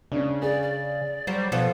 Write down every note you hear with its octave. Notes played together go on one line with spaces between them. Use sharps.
C#3 C#4 D4
G#4 D5
D5
F#3 G3 C5
B2 F3 B3 A4